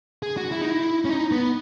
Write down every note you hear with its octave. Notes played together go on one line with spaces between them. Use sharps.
G#4
F#4
E4
D#4
E4
C#4
D#4
B3